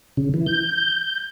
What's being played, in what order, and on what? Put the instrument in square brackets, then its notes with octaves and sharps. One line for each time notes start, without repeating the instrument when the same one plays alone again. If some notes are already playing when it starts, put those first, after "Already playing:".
[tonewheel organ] C#3
E3
G6